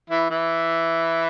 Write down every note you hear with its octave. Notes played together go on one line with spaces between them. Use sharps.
E3 E4
E3 E4